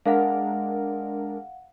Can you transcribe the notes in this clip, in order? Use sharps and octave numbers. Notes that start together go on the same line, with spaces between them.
G#3 D4 A#4 F5 F#5